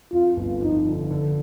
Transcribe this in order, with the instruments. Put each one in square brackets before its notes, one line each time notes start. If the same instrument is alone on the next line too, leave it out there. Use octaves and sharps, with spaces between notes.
[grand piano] F2 [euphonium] F4
[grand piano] G1
[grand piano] F3 [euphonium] D#4
[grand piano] D3
D3